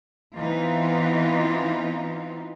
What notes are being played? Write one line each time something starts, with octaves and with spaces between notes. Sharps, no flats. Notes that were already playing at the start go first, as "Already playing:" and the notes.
E3 B3 C4 D#4 F4